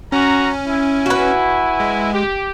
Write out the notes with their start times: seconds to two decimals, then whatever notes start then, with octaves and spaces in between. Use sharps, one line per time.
0.12 C#4 F#4 A#5
0.67 E4 G#5
1.06 F#4 B4
1.80 G#3
2.13 G4